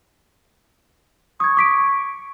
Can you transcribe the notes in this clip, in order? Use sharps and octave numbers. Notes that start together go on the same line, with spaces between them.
C#6 D#6 G#6
D6 B6 D7